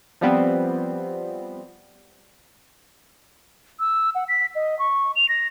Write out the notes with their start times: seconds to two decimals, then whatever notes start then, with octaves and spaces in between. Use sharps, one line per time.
0.21 F3 G3 B3 C4
3.80 E6
4.15 F#5
4.28 B6
4.55 D#5
4.79 C#6
5.16 F7
5.29 A#6